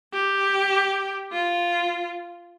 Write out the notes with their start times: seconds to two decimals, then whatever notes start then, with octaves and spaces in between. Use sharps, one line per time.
0.13 G4
1.32 F4